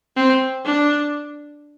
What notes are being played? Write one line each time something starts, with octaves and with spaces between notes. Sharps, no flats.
C4
D4